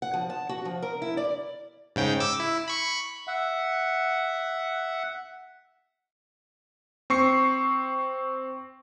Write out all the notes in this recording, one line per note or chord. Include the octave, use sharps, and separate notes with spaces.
F#5
F3
A5
F#4
F3
A#4
E4
D5
G#2 C#3 G5
D6 E6
E4
B5 C#6
E5 F#5
C4 C#6 C7